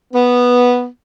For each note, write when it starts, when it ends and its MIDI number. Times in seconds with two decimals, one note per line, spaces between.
0.13 0.85 59